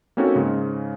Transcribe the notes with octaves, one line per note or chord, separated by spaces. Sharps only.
A#3 C4 C#4 D#4 F#4 A4
G#2 C#3